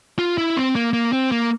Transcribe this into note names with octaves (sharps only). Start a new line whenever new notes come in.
F4
E4
C4
A#3
A#3
C4
A#3